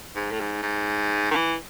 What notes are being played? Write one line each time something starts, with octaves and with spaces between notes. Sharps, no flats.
G#2
A2
G#2
G#2
D#3
E3